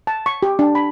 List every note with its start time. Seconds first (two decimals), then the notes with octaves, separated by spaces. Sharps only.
0.07 A5
0.26 C#6
0.43 G4
0.59 D4
0.75 B5